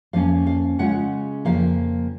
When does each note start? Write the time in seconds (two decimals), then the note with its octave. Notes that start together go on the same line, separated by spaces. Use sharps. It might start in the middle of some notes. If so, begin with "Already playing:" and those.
0.13 F2 F3 A#3 C#4 F5
0.47 F5
0.79 C#3 G#3 C#4 F4 F#5
1.45 F2 C#3 F3 A#3 F5